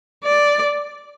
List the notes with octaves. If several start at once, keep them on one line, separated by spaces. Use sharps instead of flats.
D5